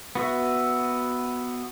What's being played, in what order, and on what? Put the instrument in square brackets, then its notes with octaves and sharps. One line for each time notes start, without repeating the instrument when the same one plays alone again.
[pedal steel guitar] B3 F#4 E5